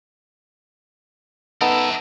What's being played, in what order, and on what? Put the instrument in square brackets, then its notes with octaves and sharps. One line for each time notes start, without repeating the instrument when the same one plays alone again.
[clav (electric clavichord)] B3 D#4 A4 [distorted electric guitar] A#4 E5